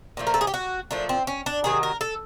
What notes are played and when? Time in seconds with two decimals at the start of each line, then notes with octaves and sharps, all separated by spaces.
0.17 A#2 F3 A3
0.27 A#4
0.34 A4
0.41 G#4
0.47 G4
0.54 F#4
0.91 A#2 F3 A3 D4
1.09 C4
1.27 C#4
1.46 D4
1.64 C3 D#3 F#3 G#4
1.83 A#4
2.01 A4